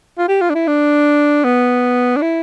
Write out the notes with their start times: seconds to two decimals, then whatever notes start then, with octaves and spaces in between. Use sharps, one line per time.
0.19 F4
0.28 G4
0.42 F4
0.50 D4
0.55 E4
0.67 D4
1.44 B3
2.17 D4
2.22 E4